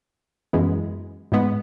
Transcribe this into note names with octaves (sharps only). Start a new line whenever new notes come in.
F#2 E3 G#3 B3
G#2 G#3 B3